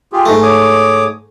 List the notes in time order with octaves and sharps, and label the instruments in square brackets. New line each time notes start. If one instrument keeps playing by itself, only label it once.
[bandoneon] F4 G4 G#4
[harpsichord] G#2 A3 [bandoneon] E3
[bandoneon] C#5 D6 D#6